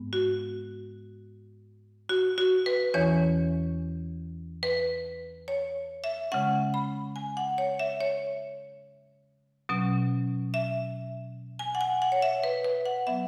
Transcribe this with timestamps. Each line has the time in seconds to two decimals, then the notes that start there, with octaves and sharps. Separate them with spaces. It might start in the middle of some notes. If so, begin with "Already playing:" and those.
Already playing: G#2 G#3 B3
0.13 F#4
2.09 F#4
2.38 F#4
2.66 B4
2.94 E2 E3 C#4 C#5
4.63 B4
5.48 C#5
6.04 E5
6.32 C#3 G#3 C#4 F#5
6.74 B5
7.16 G#5
7.37 F#5
7.58 C#5
7.79 E5
8.01 C#5
9.69 B2 F#3 C#4
10.54 E5
11.59 G#5
11.75 F#5
11.81 G#5
12.02 F#5
12.12 C#5
12.22 E5
12.44 B4
12.64 B4
12.86 F#5
13.07 F#3 B3 E5